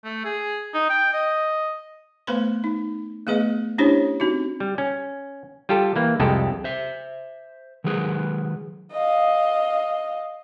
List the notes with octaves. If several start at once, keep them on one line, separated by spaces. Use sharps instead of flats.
A3
G#4
D#4
G5
D#5
A3 B3 B4 C5 B5 C6
D#4
A3 B3 G#4 B4 D#5
C#4 D4 E4 G4 C5 C#5
C4 D#4 F#4
G3
C#4
G3 F4 G4 A4
E3 A#3
C2 F2 G#3 C4 G4 A4
C5 E5
D#3 F#3 G#3 G#4 B4
D#5 F5